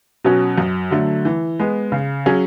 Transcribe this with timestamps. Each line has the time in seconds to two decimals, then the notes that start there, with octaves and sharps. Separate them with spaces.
0.25 B2 F#3 C#4 F#4
0.58 F#2
0.91 D3 F#3 A3
1.25 E3
1.59 G#3 B3
1.92 C#3
2.26 F#3 C#4 G#4